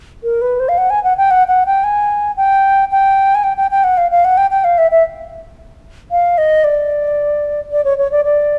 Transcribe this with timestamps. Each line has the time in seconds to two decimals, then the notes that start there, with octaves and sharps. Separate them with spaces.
0.24 A#4
0.41 B4
0.60 C5
0.69 F5
0.78 F#5
0.90 G#5
1.04 F#5
1.17 G5
1.31 F#5
1.48 F#5
1.66 G5
1.84 G#5
2.37 G5
2.91 G5
3.35 G#5
3.44 G5
3.57 G5
3.71 G5
3.84 F#5
3.97 F5
4.11 F5
4.25 F#5
4.37 G5
4.51 G5
4.64 F5
4.78 E5
4.91 E5
6.11 F5
6.38 D#5
6.64 D5
7.72 D5
7.84 C#5
7.98 C#5
8.12 D5
8.25 D5